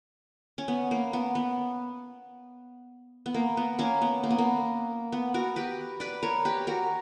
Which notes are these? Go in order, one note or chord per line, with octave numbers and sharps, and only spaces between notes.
C#4
B3
A#3
B3
B3
B3
A#3
B3
A#3 C#4
B3
A#3
B3
A#3
B3
F#4 A#4
G4 B4
B4 D5
A#4 C#5
G4 B4
F#4 A#4